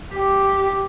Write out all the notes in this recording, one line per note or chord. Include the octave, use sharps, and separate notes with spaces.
G4